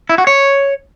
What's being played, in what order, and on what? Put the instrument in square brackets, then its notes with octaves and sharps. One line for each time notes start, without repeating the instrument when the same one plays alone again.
[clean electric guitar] E4
F#4
C#5